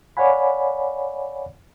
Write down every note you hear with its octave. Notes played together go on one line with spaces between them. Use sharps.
C#5 D5 F5 F#5 G#5 B5